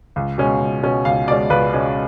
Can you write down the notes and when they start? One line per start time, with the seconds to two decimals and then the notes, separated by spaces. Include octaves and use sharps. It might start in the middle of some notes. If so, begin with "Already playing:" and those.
0.16 C#2
0.38 B2 G#3 C#4
0.60 C#2
0.83 B2 G#3 C#4
1.05 C#2 F5
1.28 B2 G#3 C#4 D5
1.50 C#2 B4
1.73 B2 G#3 C#4